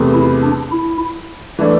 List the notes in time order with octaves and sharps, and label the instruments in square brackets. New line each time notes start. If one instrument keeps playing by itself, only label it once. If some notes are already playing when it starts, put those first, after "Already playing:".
Already playing: [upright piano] E2 C3 A3
[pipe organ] E4
D4
E4
[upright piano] E3 A3 D4